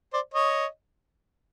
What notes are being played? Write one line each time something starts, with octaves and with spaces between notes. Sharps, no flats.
C5 D5
C#5 D#5